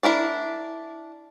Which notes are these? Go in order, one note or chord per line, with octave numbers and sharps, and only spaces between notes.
D4 E4 A#4 D5